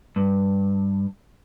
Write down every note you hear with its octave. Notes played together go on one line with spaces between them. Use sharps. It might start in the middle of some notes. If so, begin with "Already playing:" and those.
G2